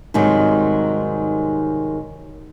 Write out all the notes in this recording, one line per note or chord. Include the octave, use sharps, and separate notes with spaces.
G#2 C3 D#3 F#3 G3